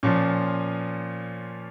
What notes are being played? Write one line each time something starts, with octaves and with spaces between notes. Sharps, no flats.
A#2 F3 C#4